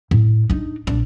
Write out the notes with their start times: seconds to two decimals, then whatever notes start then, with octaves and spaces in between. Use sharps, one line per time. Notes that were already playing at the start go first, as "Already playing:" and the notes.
0.11 A2
0.50 D4 D#4
0.87 A#1 D4